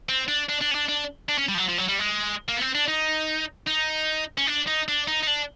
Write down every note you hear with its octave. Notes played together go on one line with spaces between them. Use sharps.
C4
D4
D4
D4
C#4
D4
D4
D4
C#4
G3
F3
F#3
F3
F#3
G3
G#3
A#3
B3
C4
D4
D#4
D#4
C#4
D4
D#4
D4
D#4
D#4
D4